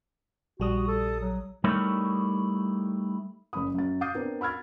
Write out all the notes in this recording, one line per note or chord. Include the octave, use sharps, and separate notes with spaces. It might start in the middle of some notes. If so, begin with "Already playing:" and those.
A#1 G3 F#4 D#6
A4
F#3
G3 A3 D#4 E4 A#4 C#5
F#1 C#4 B5 D#6
F#2 A6
D6 D#6 G6 A6 C7 D#7
B3 C4 D4 A#4 C5
B5 E6 F6 G#6 A6